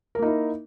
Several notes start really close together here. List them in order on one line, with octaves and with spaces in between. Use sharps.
A#4 A#3 D#4 E4